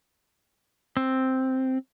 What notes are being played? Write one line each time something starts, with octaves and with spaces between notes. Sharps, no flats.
C4